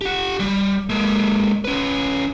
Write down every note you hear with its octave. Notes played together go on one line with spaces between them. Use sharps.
G4 F#5
G3
G#3 A#3
C#4 B4